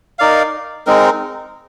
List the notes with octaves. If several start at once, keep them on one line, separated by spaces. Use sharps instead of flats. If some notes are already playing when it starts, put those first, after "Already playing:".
D#4 A#4 D5 F5
G#3 C4 D#4 A#4